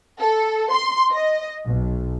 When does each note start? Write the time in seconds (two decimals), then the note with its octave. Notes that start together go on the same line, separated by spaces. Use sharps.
0.19 A4
0.72 C6
1.12 D#5
1.64 B1